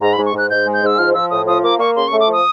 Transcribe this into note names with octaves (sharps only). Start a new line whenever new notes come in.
G#2 A#5
B5
G#2
C#6
G#2 F#6
G#2 G6
G#3
G6
G#2 E6
F3 F6
F3 E6
A2 D#6
F3 D#6
A#3 D6
A#3 C#6
C#3 C6
C#6
A3
D6
F3
D#6